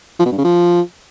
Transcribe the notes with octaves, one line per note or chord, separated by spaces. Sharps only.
F3
B2
G2
C#3
F3